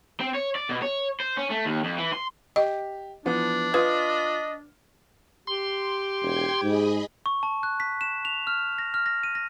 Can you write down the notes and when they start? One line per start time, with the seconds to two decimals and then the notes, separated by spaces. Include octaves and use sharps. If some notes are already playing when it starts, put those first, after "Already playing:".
0.20 C4
0.35 C#5
0.55 D5
0.69 B2
0.82 C#5
1.20 C5
1.37 C#4
1.50 A3
1.65 D#2
1.84 F2
1.98 E3
2.13 C6
2.56 G4 D#5
3.25 E3 F3 B3 D4
3.74 F4 B4 D#5 D#6
5.47 G4 C6
6.22 E1 G5 G#6
6.63 G#2 G#4 D#5 B5
7.26 C#6
7.43 A5
7.63 F#6
7.80 B6
8.01 E7
8.25 F7
8.47 F6
8.78 A#6
8.94 F6
9.06 A#6
9.23 D#7
9.35 A#6